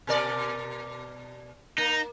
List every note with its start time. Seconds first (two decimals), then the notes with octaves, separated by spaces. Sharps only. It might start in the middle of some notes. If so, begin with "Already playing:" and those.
0.07 B2 A#4 D5
1.78 A#3 D#4